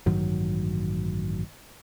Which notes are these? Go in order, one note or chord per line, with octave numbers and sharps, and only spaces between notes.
A1 G2 D#3 F#3